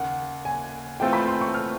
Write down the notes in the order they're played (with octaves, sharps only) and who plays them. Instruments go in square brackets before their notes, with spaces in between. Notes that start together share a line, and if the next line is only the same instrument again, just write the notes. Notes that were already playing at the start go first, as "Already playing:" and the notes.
Already playing: [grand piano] D#2 C#3 A#3 [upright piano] F#5
[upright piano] G#5
[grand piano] E3 A3 C4 F4 A4 [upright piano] G5
[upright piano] B5
C6
C#6
F6